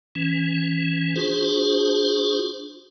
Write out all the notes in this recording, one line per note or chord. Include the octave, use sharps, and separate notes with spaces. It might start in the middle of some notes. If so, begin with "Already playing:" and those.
E3 C#4
D4 F4 F#4 G#4 C5